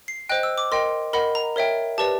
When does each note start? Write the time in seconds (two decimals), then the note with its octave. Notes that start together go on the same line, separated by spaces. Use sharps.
0.08 C7
0.29 C5 D#5 G5 F#6
0.43 E6
0.58 D6
0.72 A#4 D#5 G5 C6
1.13 A#4 D#5 F#5 B5
1.35 A#5
1.56 A#4 C#5 E5 G5
1.98 G4 B4 D5 A5